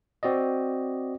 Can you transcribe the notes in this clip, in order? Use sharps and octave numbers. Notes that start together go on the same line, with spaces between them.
C4 F#4 D5 D#5